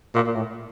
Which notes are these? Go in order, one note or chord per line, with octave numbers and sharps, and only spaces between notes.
A#2
A#2
A2